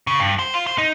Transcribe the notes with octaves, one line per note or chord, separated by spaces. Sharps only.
C#3
G2
C5
F4
C5
D#4